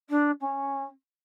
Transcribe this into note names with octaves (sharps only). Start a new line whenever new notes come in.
D4
C#4